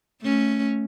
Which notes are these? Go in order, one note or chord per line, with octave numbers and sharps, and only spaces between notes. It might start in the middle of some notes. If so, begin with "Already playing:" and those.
A3 C#4